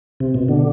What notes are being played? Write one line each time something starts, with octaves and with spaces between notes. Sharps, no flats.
C3
B2
D3